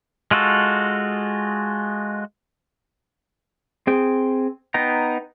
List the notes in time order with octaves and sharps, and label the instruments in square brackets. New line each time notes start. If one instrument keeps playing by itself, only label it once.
[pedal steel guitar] G#3 F4 F#4 A4
C4 G#4 G5
B3 D#4 G5 A#5